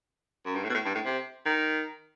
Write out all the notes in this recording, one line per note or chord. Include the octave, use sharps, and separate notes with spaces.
F#2
G2
A2
B2
A2
G2
A2
C3
D#3